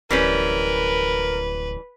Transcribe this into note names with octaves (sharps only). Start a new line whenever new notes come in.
D1 E3 G3 C#4 A#4 B4